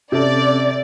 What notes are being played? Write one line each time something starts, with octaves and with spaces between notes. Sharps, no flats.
C3 C4 C#4 A4 D5